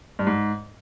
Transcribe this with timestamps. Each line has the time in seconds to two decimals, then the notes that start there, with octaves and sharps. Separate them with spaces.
0.19 G2
0.27 G#2